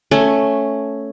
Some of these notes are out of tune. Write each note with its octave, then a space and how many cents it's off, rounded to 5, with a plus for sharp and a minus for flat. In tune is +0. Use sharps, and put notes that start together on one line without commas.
A3 +0 C#4 +0